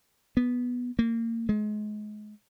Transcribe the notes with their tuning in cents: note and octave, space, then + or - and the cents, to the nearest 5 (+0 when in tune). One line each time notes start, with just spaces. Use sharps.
B3 -5
A#3 -25
G#3 +30